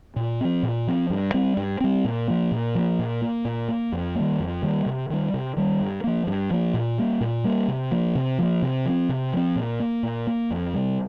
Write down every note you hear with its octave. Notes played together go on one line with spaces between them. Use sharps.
A#2
F3 C4
A#2
F3 C4
G2
G3 C4
G2
G3 C4
A#2
F3 A#3
A#2
F3 A#3
A#2
A#3
A#2
A#3
F2
D#3 G3 A#3
F2
D#3 G3 A#3
C3
D#3 G3
C3
D#3 G3
G2
F3 A#3
G2
F3 A#3
A#2
G3 A#3
A#2
G3 A#3
C3
F3 A#3
C3
F3 A#3
C3
F3 C4
C3
F3 C4
A#2
A#3
A#2
A#3
F2
C3 G3